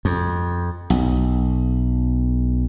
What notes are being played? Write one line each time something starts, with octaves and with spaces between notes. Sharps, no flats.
F2
B1